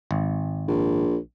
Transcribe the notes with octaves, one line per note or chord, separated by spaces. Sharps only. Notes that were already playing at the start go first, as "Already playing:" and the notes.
G#1
A#1